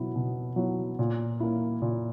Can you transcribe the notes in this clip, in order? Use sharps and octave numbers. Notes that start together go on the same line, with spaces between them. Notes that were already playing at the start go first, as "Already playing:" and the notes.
Already playing: B2 F#3 B3 E4
B2
F#3 B3 E4
A#2
A#3 E4
A#2